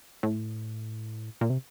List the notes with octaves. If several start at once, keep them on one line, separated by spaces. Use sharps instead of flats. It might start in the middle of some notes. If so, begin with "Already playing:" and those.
A2
A#2
C3